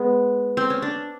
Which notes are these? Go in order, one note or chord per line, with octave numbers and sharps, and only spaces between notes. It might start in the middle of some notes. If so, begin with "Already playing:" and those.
Already playing: G#3 B3
C4
C#4
D4